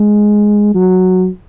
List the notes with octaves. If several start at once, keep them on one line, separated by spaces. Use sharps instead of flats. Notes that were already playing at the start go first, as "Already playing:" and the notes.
Already playing: G#3
F#3